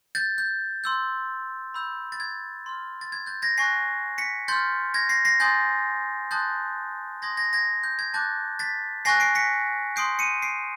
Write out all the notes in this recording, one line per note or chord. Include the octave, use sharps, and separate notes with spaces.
G6 A6
G6
C6 E6 G6
B5 E6 G6
A6
G#6
C6 F6
A6
G#6
G6 A6
G#6 A#6
G#5 C#6 F#6 A#6 C7
B6 C#7
C6 F6 G6 A6
G#6 A#6
A#6 C7
A#6 C7
G#5 C6 D#6 G6 A6
A5 C6 D#6 F#6 G6 A6
C6 D#6 G6 G#6 A#6
G#6 A#6
G#6 A#6
G6
G#6
A5 D6 F#6 G6 A6
A6 B6
G#5 C#6 F#6 A#6 C7
C7 D7
B6 C#7
C6 D#6 G6 C7 D7
C#7 D#7
C7 D7